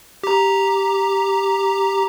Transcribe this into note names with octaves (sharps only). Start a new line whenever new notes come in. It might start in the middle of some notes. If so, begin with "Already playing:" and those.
G4 A#5